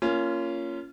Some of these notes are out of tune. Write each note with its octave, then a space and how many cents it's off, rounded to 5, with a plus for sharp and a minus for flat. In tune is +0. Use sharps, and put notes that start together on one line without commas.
A#3 +0 C#4 +10 F4 -25